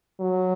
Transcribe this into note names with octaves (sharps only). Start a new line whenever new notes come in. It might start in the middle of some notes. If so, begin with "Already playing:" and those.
F#3